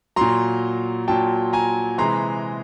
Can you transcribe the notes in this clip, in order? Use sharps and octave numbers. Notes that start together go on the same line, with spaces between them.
A#2 F#3 A#5 C6
A#2 F#3 G5 A5
G#5 A#5
C3 E3 G#3 A#5 C6